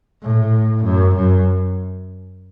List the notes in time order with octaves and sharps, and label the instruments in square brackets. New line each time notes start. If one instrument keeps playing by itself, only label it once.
[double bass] A2
F#2
F#2